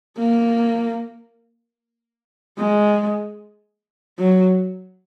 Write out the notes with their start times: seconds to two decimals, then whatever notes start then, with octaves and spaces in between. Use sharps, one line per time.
0.18 A#3
2.58 G#3
4.19 F#3